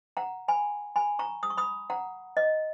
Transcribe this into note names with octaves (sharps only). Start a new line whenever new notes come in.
F#5 A#5
G#5 B5
G#5 B5
A#5 C#6
D#6
C#6
B5 D#6
F#5 A#5
D#5